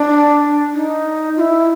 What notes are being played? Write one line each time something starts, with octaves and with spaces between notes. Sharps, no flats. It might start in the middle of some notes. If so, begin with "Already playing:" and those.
Already playing: D4
D#4
F4
E4